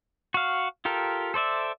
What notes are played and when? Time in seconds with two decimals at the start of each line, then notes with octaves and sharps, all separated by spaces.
0.34 F#4 F5
0.85 F4 G4 A4 A#4
1.34 A4 C5 D5 E5